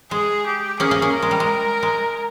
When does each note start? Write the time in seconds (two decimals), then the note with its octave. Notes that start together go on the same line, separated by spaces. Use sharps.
0.11 G#3 G#4
0.47 G4
0.79 A#3 C#4 G#4
0.91 A#3 C#4
1.02 A#3 C#4
1.14 A#4
1.22 G#3
1.31 G3
1.40 G#3
1.83 G#3